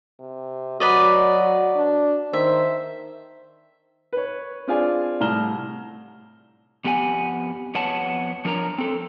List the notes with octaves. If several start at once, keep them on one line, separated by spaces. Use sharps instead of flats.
C3
F#3 F#4 B4 D5 D#5
D4
D#3 C5 E5
B4 C#5
C4 D4 F4 G#4 D5 G#5
C2 A2 A#5 F6 E7 G7
F2 B3 G4 F#5 G#5
F2 B3 C#5 F#5 A5
F3 D4 A#4 C#5 A#5
C4 A4